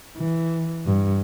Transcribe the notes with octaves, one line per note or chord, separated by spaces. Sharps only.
E3
G2